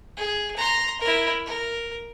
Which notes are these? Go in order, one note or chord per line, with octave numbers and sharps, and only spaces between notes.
G#4
A#5 C6
E4 A#4
A#4